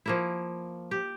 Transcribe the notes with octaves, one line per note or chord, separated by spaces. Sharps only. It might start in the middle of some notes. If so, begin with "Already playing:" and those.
F3 A#3 E4
G4